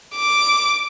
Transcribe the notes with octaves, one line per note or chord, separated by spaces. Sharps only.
D6